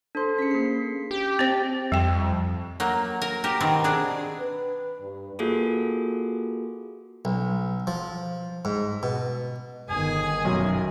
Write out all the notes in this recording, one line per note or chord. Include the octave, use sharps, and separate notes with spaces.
D4 A4 C5 C6
C#4 G#4 B6 C#7
A#3 C7
G4
C4 C5
F2 G3 G5
F#3 A#3
A#4
G4 A#4
B2 D#3 C4
D4 G#4 D5
B4
G2
A#3 F4 F#4 G#4 A4
B1
F3
G#2
B2
G1 D#3 G#4 G#5
B1 F#2